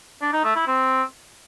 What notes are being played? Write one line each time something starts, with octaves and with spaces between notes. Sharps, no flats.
D4
D#4
A3
E4
C4